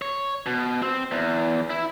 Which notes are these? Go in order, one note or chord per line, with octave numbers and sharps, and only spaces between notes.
C#5
B2
C4
E2
E4